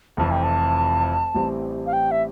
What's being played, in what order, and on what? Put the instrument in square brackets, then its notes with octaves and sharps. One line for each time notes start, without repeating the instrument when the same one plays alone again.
[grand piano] F1 F2 E3 [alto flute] A5
[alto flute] G5
A5
[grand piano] A1 A2 E3 G3 C4
[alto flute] F5
G5
E5